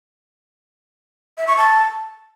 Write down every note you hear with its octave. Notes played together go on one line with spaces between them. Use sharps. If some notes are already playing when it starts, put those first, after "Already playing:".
E5
C#6
A5